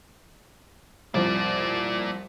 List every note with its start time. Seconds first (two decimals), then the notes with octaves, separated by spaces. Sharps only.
1.14 C2 F2 A#3 D5